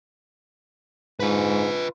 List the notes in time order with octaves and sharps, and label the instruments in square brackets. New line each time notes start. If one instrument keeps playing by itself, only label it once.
[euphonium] G#2 [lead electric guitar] F4 B4